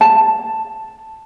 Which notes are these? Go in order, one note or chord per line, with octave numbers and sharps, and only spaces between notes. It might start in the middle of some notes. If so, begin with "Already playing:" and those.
A5